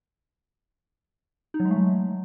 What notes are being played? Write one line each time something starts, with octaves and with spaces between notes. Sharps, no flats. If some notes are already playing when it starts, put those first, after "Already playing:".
D#4
F#3
G#3
A3
F#3